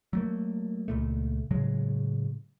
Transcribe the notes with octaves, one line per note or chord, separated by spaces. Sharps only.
F#3 A3 A#3
C#2 A#2 A3
A2 C#3 F#3 G#3